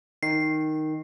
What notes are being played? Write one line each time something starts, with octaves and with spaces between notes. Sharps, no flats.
D#3 C7